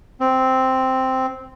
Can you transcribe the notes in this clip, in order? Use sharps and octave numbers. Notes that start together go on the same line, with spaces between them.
C4